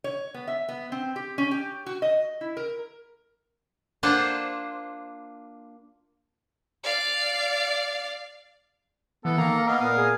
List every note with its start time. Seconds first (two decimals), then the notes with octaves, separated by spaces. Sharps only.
0.04 C#5
0.34 B3
0.48 E5
0.69 B3
0.92 C4
1.16 G4
1.38 C#4
1.51 G4
1.86 F#4
2.02 D#5
2.41 E4
2.57 A#4
4.03 A#3 D4 F4 C5 F#5 A5
6.84 D5 F5
9.25 E3 B3 A4
9.38 D#3 A#3 A#4 F5 A#5
9.67 B3 A#4 D#5 F5
9.81 A#2 B3 D#6
9.97 G#4